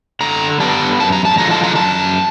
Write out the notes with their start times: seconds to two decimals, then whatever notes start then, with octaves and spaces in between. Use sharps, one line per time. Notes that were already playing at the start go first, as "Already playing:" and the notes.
0.21 D3 A#5
0.60 G3 B3 D4 A5
0.99 F#2 A5
1.12 A#5
1.25 A5
1.38 D3 F3 G#3 A#5
1.51 A5
1.64 A#5
1.76 F#2 A5